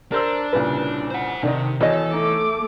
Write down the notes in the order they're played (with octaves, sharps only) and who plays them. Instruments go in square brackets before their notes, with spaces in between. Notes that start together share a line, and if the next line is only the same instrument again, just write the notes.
[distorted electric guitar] D4 [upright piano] A#4 C5 E6
[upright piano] C2 A#2 C#3 [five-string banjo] B4
[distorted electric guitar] C5 F#5
[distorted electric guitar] C3 [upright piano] D#3 [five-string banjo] D4 D#4
[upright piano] E2 [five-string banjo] F#4 C#5 D#5 [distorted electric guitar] A4
[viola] A3 D6 [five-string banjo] D#4